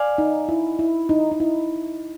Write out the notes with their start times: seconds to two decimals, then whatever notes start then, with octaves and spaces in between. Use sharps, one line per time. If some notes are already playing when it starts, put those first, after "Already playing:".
Already playing: D5 F5 G#5
0.18 D#4
0.49 E4
0.79 E4
1.09 D#4
1.32 D#4
1.40 E4